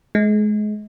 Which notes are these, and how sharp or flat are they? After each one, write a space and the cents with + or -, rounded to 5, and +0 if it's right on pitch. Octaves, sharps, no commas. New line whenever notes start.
G#3 +30